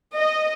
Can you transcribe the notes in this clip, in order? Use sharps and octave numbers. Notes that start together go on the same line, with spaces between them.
D#5